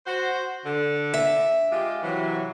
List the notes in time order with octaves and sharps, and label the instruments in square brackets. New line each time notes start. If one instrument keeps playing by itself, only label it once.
[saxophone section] F#4 C5
D3
[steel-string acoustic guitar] E5
[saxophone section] G#3 F4 G4
C3 E3 F#3